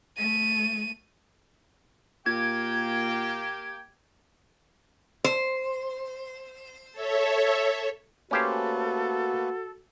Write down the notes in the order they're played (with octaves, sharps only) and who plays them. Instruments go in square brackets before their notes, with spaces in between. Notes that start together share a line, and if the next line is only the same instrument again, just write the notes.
[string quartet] A3 [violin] D#7
[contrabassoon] A#2 [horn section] A#3 G4 G5 [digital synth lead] G#6
[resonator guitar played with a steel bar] C5
[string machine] A4 C#5 E5
[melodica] A3 A#3 B4 [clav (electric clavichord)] C#4 G4 C5 [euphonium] F#4 [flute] A4